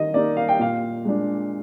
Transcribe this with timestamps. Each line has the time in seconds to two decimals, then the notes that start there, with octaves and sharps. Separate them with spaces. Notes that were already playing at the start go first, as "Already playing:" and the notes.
Already playing: D#3 D#5
0.13 A#3 D#4 D5
0.37 F5
0.48 G5
0.59 A#2 F5
1.05 G#3 D4